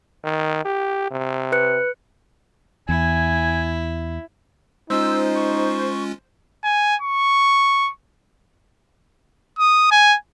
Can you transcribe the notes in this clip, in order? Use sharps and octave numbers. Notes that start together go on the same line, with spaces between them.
D#3
G4
C3
B4 F#6 C#7
E2 E4 G#5
G#3 C#4 D#4 F4 C5 E6
C#6
G#5
C#6
D#6
G#5